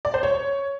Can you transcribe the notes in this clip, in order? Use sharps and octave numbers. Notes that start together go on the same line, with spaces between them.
D5
C5
C#5